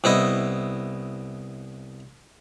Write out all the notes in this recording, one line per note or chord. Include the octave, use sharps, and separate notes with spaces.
C2 B3 E4 D#5